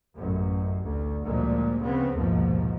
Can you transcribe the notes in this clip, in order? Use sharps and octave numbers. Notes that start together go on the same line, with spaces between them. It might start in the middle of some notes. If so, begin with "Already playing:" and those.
A1 F#2
D2
D2 A#2 F3 G3 G#3
C#3 B3 C4
A#1 D#2 G#2 B2 F3